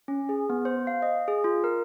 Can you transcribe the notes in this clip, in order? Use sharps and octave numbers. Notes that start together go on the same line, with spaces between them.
C#4
G#4
B3
C5
F5
D#5
G#4
F4
A#4